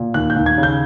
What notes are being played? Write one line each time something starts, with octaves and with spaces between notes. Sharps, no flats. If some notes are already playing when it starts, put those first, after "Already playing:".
Already playing: A#2
D#2 F#6
G6
D#2
G#6
C#3
G6